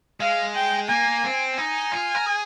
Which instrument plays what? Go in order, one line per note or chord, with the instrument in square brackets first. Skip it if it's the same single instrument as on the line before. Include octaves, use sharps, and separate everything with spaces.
[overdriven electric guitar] G#3 [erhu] F5
[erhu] G5
[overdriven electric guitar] A#3 [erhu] G#5
[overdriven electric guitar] C4
[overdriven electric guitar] D#4 [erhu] G#5
[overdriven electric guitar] F4
A#4
G#4